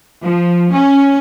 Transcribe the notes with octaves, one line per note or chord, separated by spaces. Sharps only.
F3
C#4